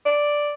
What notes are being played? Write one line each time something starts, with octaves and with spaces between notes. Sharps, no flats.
D5